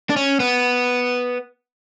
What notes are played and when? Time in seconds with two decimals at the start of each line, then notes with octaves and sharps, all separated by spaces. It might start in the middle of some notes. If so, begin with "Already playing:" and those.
0.10 D4
0.17 C#4
0.40 B3